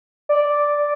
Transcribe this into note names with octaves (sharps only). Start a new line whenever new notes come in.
D5